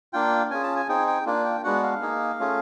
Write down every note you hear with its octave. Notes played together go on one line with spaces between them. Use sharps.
A#3 D4 F4 G5
C#4 F4 G#4 G#5
A5
G#5
C4 D#4 G#4 G5
G5
A#3 D4 F4
G5
G#3 B3 D4 F#4 F#5
F5
A#3 D#4 G#4
A3 C#4 F4 G#4